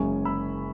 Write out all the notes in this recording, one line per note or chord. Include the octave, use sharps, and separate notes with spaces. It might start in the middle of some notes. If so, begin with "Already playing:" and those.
Already playing: F#1 F#2 C#3 G#3 C#4 G#5 C#6
B5 E6